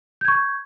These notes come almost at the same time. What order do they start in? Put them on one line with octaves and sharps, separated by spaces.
G6 G#6 C#6